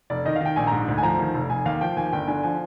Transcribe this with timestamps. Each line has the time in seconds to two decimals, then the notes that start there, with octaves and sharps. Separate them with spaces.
0.10 F1 D5
0.25 D#3 D#5
0.36 F5
0.41 D#3 G5
0.56 A#1 G#5
0.67 A#5
0.72 G#2
0.88 D2
0.98 G#5
1.03 F3 A#5
1.19 D#3
1.34 F1
1.50 F1 G#5
1.65 D#2 F5
1.81 F3 G5
1.96 D#2 G#5
2.12 G1 G5
2.28 D3 G#5
2.43 F3 G#5